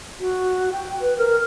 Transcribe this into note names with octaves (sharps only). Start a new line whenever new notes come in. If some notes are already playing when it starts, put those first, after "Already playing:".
F#4
G5
B4
A#4